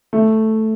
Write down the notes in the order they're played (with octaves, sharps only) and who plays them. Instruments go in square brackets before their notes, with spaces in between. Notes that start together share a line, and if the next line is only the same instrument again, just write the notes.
[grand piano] A3